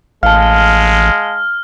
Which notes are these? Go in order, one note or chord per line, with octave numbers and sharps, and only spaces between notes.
A1 G#3 F5 A5 F6